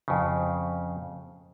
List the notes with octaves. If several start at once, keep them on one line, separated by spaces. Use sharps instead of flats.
F2 C#3